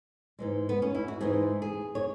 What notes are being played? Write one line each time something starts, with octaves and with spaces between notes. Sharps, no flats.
G#2 E3 G#3
B3
C#4
E4
F#4
G#2 E3 G#3 G#4
G#4
C#5